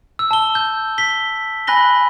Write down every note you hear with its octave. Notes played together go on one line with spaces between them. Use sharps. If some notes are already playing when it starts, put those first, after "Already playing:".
E6
A5 G7
G6
B6 G7
G#5 B5 F#6 A#6 G7